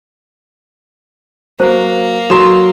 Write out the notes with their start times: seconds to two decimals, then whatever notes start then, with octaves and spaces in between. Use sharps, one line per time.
1.60 F#3 A#3 C5
2.30 F#3 A4 F5 A#5 C6 E7